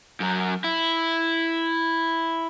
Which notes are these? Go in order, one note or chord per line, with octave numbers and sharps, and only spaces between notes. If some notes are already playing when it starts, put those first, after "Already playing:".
F#2 F#3
E4